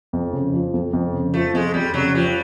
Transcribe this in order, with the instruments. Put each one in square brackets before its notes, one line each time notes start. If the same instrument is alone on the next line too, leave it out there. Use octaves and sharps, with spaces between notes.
[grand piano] F2
C#3
F3
F2
F2
C#3
[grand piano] F3 [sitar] A3
[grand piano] F2 [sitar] G#3
[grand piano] F2 [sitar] G3
[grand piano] C#3 [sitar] F#3
[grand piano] F3 [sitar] G3